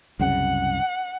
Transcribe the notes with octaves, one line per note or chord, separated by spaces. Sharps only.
C2 F#2 C#3 F#5